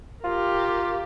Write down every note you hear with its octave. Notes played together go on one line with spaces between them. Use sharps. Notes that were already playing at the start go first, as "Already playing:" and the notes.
F4 G4 A#4